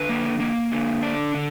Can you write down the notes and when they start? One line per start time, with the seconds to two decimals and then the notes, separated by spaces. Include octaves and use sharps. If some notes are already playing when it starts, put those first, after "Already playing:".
Already playing: D3 B4
0.09 A#3
0.40 A#3
0.72 D3
1.03 D4
1.34 D3